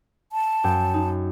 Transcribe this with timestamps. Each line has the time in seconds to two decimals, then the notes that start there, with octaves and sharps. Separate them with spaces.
0.32 A5
0.64 F#2 G5
0.94 D#4